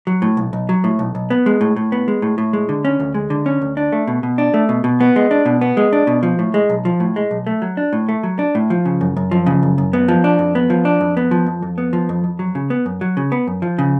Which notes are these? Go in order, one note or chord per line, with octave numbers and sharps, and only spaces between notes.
F#3
A2
B1
B1
F#3
A2
B1
B1
B3
G#3
A2
A2
B3
G#3
A2
A2
G#3
D3
C#4
D2
G#3
D3
C#4
D2
D4
A3
B2
B2
D4
A3
B2
B2
B3
G#3
D4
B2
B3
G#3
D4
B2
F3
A2
G#3
B1
F3
A2
G#3
B1
A3
F#3
D4
A2
A3
F#3
D4
A2
F3
C#3
F#2
F#2
F3
C#3
F#2
F#2
B3
F3
D4
F2
B3
F3
D4
F2
B3
F3
F2
F2
B3
F3
F2
F2
F#3
C#3
B3
F#2
F#3
C#3
B3
F#2
F3
C#3